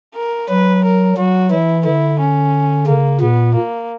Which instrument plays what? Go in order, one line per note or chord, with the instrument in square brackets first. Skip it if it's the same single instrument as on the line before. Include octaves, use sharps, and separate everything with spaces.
[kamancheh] A#4
[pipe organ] F#3 [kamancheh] B4
[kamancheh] A#4
[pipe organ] F#3 [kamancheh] F#4
[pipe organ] E3 [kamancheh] E4
[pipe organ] D3 [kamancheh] E4
[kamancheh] C#4
[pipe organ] C#3 [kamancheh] A#3
[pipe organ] A#2 [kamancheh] B3
[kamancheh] A#3